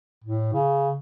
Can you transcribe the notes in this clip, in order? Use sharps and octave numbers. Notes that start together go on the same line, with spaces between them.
A2
C#3